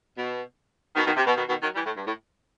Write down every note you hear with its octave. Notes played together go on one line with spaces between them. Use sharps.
B2
B2 D#3
B2 D#3
C3
B2
B2 D#3
B2 D#3
D#3 F#3
E3 G3
A2
G2
A2